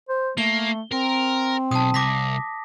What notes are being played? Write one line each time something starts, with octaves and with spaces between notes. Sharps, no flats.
C5
A3 A#3 G7
C4 A#4
B1 A5 D#6
C2 D6 A#6 B6